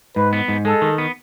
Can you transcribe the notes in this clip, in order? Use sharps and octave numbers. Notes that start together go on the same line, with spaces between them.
G#2 B4
B3
G#2
G#3 A4
D#3
B3